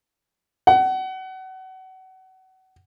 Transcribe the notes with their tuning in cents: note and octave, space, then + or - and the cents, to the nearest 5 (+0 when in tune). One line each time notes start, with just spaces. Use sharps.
F#5 +30